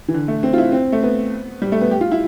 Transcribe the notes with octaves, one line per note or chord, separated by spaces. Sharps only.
E3
D3
A3
C4
F4
E4
C4
A3
B3
G3
A3
B3
G4
F4
E4